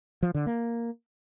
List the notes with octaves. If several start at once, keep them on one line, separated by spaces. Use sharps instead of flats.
F3
D3
A#3